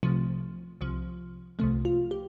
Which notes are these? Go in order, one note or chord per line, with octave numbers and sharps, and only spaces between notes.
C2 C3 F3 A3
C2 C3 F3
C2 C3 F3 A3
F4
G4